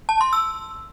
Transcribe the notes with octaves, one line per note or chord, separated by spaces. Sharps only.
A5
C6
E6